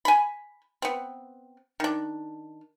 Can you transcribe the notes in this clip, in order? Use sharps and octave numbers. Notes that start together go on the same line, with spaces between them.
G#5 B5
B3 C4
D#3 D4